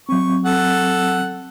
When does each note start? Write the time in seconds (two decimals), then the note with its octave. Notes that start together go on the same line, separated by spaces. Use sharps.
0.09 F#3 C4 C#6
0.46 A4 F#5